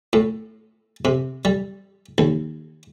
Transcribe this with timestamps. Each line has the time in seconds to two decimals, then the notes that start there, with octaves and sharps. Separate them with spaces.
0.13 A2
1.05 C3
1.45 G3
2.18 D#2